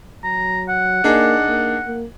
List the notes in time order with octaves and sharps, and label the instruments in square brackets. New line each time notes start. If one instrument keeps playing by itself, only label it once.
[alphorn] F#3 [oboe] A#5
[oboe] F#5
[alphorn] A#3 [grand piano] D4 D#4 G#4
[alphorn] A#3
A#3